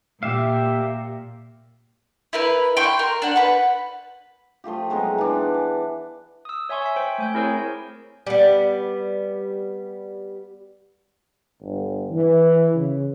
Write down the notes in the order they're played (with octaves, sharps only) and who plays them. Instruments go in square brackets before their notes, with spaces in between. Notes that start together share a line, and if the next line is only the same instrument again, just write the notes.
[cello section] A#2 [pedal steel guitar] G4 E5 F5
[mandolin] E4 A#4 B4
G5 C6 C#6 F#6
A#4
D4 F#5
B4 F#5
[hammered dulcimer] F3 A3 F4 G4
F#3 G#3 B3 D#4
E3 D4
D6
[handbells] D#6 E6
C#5 E5 G#5 C6 C#6
E6 B6
C5 G5
A3 G#5 G6
C4 E4 G#4 A#4 C5 C#5
[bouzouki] G3 B3
[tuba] G1
E3
C#3